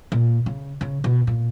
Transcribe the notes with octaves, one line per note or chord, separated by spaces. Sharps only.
A#2
C#3
C#3
B2
A#2